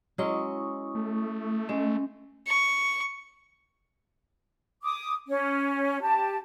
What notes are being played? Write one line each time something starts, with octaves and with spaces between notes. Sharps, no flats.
F#3 G#3 C#4 E4 C#6 D#6
A3
G#3 C#4
C#6
D6 D#6
C#4
G4 A5